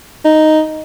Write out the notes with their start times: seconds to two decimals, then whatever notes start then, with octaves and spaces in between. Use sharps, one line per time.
0.25 D#4